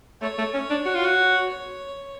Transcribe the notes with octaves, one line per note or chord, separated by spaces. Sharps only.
A3 C#5
A3
C#4
D4
F#4
F4
F#4
C#5